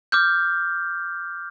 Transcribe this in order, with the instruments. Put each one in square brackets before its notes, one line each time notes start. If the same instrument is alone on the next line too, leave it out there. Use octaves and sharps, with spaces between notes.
[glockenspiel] D6 F6 G6